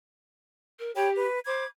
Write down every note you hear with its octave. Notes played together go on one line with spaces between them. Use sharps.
A#4
G4 C#5 G5 B5
B4
C5 B5 D6 G#6